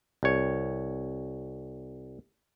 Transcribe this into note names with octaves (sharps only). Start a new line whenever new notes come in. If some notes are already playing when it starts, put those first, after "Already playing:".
C2 C#5